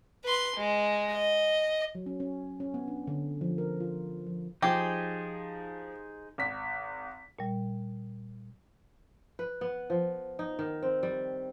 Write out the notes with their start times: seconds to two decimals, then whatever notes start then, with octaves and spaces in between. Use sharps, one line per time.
0.25 B4 C6
0.56 G#3
1.12 D#5
1.95 F#3
2.06 C#4
2.20 C#4
2.60 C#4
2.74 B3
2.88 D4
3.07 D3
3.41 F3
3.58 A#4
3.80 F4
4.27 F3
4.62 F3 D#4 G4 G#4 C5
6.38 G#1 B6
7.39 A#2 G3
9.39 B4
9.61 B3
9.90 F3
10.39 D#4
10.59 D#3
10.83 C4
11.03 G3